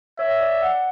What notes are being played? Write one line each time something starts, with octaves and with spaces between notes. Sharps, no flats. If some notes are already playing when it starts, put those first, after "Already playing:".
C#5 E5
D5
F#5